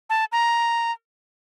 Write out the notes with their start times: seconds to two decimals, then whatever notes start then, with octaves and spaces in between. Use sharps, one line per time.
0.10 A5
0.32 A#5